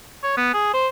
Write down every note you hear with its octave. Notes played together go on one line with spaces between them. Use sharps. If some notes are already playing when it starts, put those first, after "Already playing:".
C#5
B3
G#4
C5